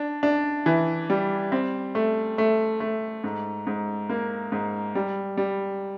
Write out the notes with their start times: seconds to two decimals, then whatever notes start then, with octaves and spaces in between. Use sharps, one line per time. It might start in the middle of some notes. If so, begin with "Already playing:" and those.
Already playing: D4
0.23 D4
0.66 E3
1.10 G3
1.52 C4
1.95 A3
2.38 A3
2.80 A3
3.24 G#2
3.67 G#2
4.09 A#3
4.52 G#2
4.95 G3
5.37 G3